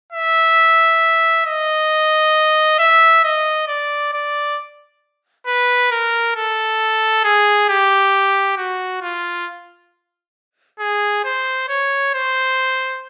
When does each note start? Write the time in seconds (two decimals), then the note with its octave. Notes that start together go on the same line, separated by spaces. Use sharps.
0.12 E5
1.45 D#5
2.79 E5
3.24 D#5
3.68 D5
4.13 D5
5.47 B4
5.91 A#4
6.36 A4
7.24 G#4
7.69 G4
8.57 F#4
9.02 F4
10.80 G#4
11.25 C5
11.69 C#5
12.14 C5